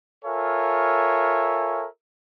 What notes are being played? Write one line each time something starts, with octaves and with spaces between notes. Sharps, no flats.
F4 A4 A#4 C#5 E5 G#5